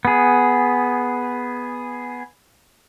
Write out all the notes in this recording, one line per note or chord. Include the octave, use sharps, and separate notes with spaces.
B3 G#4